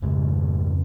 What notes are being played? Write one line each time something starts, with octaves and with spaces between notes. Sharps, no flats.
F2 G#2 C#3 G#3